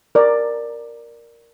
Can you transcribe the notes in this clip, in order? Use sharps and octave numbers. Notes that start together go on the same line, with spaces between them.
A#4 D5